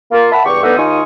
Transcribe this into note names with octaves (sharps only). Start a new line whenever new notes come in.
A#3 F4
E5 F#5 A5 B5
E2 G2 G4 C#6
A3 B3 D4 D#4 E5 F#5
D#2 D#4 F4 G#5 C#6 D#6